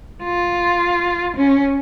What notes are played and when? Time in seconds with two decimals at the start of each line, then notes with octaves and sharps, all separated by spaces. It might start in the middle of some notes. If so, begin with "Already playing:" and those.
0.23 F4
1.37 C#4